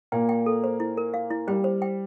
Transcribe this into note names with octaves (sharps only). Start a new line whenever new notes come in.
A#2 A#3 G5
G5
A4
C5
E4
A#4
F5
E4
G3 G5
C5
G5